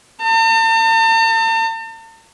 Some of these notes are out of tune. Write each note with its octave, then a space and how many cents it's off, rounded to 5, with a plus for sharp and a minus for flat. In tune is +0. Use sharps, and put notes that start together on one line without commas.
A5 +45